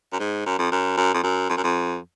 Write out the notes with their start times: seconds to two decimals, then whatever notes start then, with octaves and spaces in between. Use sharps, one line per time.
0.13 F#2
0.19 G#2
0.46 F#2
0.59 F2
0.72 F#2
0.97 F#2
1.14 F2
1.23 F#2
1.49 F2
1.57 F#2
1.64 F2